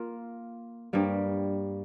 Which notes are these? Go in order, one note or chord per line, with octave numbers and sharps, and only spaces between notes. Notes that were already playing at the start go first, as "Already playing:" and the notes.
Already playing: A#3 F4 A#4
G2 G3 A#3